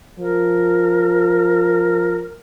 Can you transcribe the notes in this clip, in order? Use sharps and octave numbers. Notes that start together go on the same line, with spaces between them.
F3 A#4